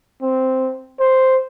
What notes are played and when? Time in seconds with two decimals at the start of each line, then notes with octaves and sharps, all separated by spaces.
0.22 C4
1.00 C5